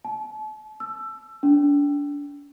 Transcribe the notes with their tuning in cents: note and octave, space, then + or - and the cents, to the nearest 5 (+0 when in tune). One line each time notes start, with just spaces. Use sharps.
A5 -35
E6 +20
D4 -30